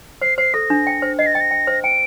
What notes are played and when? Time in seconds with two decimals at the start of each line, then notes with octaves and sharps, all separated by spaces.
0.21 C5 C7
0.38 C5 C7
0.54 A4 A#6
0.70 D4
0.87 G5
1.02 C5
1.19 D#5 C7
1.26 A#6
1.34 G5 A6
1.41 A#6
1.51 G5
1.67 C5
1.84 G5 D7